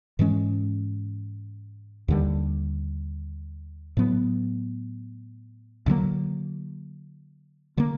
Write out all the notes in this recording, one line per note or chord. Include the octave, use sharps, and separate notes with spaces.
G#2 E3 G#3 C#4
D#2 D3 G3
A2 F#3 B3
D2 D3 F#3 A#3
D3 F3 A#3